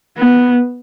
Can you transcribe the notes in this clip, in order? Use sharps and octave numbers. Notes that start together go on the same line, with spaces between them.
B3